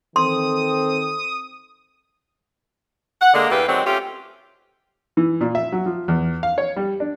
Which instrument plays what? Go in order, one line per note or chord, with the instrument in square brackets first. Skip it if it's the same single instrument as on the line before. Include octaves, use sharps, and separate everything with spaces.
[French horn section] D#3 C4 A4 [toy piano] C6 [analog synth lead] D#6
[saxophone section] F#5
D3 G#3 A#3
E2 G2 A#3 E4 G4 B4
D3 D#3 F#3 G#3 C4
A3 C#4 F4 G4
[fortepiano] E3
A#2
E5
F#3
F3
E2
F5
C#5
G3
D4